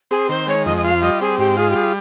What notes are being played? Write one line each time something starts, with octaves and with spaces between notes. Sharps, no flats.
C4 G#4
D#3 C5
G#3 C#5
F2 D#5
D#5
F4 F5
G3 D#5
C4 G#4
G#2 G4
F4 G#4
G4
G3 G#4